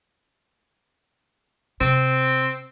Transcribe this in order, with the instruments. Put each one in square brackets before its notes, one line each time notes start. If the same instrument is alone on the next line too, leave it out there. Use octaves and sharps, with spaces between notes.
[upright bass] C3 [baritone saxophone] C4